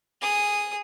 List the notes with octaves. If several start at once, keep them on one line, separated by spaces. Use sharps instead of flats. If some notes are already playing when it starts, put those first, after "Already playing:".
G#4 D#6